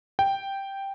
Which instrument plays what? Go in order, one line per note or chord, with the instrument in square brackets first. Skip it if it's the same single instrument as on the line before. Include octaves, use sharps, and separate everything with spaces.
[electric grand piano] G5